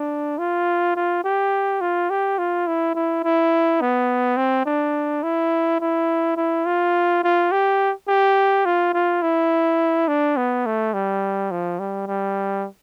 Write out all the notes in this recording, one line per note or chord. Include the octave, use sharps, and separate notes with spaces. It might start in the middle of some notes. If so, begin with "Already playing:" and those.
Already playing: D4
F4
F4
G4
F4
G4
F4
E4
E4
E4
B3
C4
D4
E4
E4
E4
F4
F4
G4
G4
F4
F4
E4
D4
B3
A3
G3
F3
G3
G3